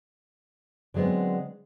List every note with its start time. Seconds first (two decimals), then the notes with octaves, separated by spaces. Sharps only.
0.94 D3 F#3 G#3 B3 C4